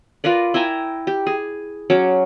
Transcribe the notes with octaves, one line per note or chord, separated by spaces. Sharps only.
F4 A#4 B4 D5
E4 G5 G#5 A#5
G4
G#4
F#3 C#4 D6